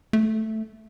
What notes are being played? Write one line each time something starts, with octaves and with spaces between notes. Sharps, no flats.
A3